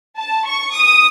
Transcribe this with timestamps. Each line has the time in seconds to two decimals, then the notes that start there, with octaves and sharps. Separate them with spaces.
0.18 A5
0.47 C#6
0.75 D#6